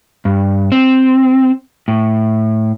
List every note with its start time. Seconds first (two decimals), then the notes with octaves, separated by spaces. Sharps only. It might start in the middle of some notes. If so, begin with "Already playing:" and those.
0.25 G2
0.72 C4
1.88 A2